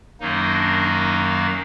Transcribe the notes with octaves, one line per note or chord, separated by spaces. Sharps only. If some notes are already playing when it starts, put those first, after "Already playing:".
F#2 D#3 F#3 A#3 D#4
D4
D#4